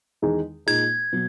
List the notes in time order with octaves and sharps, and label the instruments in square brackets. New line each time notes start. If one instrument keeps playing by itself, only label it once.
[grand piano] E2 D#3 G#3 D#4 G#4
[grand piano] A#2 G#3 D#4 G#4 [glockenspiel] G#6
[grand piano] B2 F#3